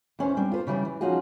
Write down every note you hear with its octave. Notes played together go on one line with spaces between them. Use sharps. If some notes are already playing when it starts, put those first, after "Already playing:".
E2 C#4 D4 C5
G3 C4 D4
F4 B4 C5
C#3 E3 G3 D4
E3
F3 C#4 D#4 F4 F#4 G#4